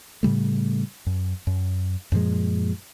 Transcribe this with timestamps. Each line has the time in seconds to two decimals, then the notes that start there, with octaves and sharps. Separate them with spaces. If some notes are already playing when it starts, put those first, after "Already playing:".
0.23 A2 C#3 G3 A3
1.07 F#2
1.47 F#2
2.12 F#2 A#2 F3 G#3